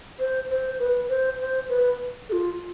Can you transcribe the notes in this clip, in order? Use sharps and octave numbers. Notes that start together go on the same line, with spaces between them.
C5
C5
B4
C5
C5
B4
A4
F4